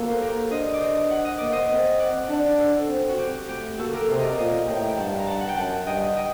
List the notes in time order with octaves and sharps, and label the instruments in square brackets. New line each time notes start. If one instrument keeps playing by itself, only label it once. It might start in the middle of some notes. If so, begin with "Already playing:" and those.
Already playing: [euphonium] A#3 [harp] F#4 A4
[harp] C5
G4 A#4
[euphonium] D4 [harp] C5 D#5
[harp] D5
C5 D#5
F#5
D#5
[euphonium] A#3 [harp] D5
[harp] C5 D#5
[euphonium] C4
[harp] D5 F#5
[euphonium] D4 [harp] F#5 A5
[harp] D5
A4 C5
[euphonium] C4
[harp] F#4
G4
[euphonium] A3 [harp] G4
[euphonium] A#3 [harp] F#4 A4
[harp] G4 A#4
[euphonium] C3 [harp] A4 C5
[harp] A#4 D5 D#5
[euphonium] A#2 [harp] C5 D#5
[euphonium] A2 [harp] G5 A#5
[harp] G5
[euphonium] G2 [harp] F#5 A5
[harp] A#5
F#5 A5
F#5
G5
[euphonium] F#2 [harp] F#5 A5
[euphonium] G2 [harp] D#5 G5
[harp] D#5 G5